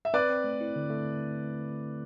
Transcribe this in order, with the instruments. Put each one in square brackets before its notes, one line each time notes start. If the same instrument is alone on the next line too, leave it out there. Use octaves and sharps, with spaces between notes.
[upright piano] E5
[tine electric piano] C4 [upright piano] B4 D5
[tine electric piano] C4
A3
E4
D3
A3